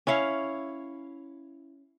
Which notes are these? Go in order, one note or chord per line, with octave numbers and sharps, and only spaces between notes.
C#4 E4 C#5 F5